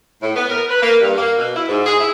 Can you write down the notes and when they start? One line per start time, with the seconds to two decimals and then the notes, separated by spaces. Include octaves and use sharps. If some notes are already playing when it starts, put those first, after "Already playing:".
0.22 A2
0.36 B3
0.49 A#4
0.69 B4
0.81 A#3
1.01 G2
1.16 A#3
1.36 B2
1.56 E4
1.68 G#2
1.86 G#4
1.99 E4